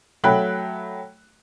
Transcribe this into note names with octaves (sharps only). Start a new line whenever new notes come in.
F#3 A3 G5 B5 F#6